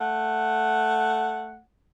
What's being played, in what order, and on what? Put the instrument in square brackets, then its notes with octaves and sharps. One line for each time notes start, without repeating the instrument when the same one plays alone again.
[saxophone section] A3 F#5